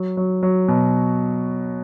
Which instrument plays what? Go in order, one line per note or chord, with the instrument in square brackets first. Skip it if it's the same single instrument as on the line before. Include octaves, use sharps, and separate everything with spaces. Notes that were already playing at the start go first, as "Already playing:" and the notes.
Already playing: [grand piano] F#3
F#3
F#3
B2